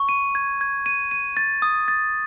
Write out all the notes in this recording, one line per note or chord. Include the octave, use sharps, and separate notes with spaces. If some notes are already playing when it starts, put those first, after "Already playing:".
Already playing: C#6
D#7
G#6
G#6
D#7
D#7
A6
D#6
A6